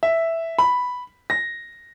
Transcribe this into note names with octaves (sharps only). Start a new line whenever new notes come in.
E5
B5
A#6